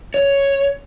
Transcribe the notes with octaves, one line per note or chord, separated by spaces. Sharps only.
C#5